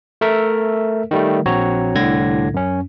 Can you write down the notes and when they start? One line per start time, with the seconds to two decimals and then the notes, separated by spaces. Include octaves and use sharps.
0.21 A3 A4 A#4 E5
1.11 D#3 G3 A3
1.46 A#1 C4 F#4 C#5 A#5
1.95 C2 A2 D3 G#6 A#6
2.54 F#2 C#4